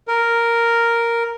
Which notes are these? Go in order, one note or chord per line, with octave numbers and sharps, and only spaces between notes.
A#4